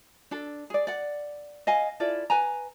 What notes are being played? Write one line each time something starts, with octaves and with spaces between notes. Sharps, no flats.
D4 A4
G#4 D5
D5 F#5
D#5 F5 G#5
E4 F4 A4 D5
B4 G#5 A#5